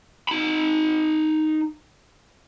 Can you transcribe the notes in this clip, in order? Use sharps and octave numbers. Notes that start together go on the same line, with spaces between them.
D#4 B5